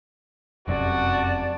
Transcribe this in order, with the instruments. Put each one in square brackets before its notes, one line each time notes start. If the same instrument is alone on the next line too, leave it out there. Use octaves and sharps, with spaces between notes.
[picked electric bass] F1 F#2 C3 [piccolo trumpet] F#4 [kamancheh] D5 A5